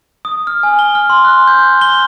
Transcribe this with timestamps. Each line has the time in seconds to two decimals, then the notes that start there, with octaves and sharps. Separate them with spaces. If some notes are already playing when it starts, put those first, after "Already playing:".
0.25 D#6
0.47 F6
0.63 G#5
0.79 G7
0.95 F6
1.10 C6
1.25 F#6
1.47 G6
1.81 G7